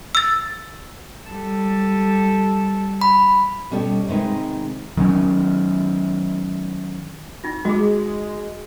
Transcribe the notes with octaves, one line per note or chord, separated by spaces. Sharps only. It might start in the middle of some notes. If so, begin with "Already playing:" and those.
E6 A6
G3 A4
B5
B2 G3 C#4 G4 A4
C3 D#3 G#3 B4
D#3 F#3 C#4
D#4 F4
G#3 F#4 G#4